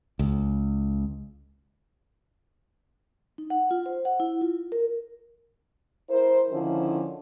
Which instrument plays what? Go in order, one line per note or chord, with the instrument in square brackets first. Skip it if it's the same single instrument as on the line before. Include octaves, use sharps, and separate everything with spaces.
[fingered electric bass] C#2
[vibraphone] D#4
F#5
F4
C5
F#5
E4
F4
A#4
[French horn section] E4 A#4 C5
D3 D#3 F3 C#4 E4